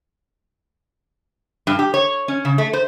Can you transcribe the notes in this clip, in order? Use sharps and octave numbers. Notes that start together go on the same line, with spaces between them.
G2
G4
C#5
C#4
C#3
A3
C5